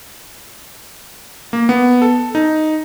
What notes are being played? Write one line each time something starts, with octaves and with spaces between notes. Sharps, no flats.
A#3
B3
A4
D#4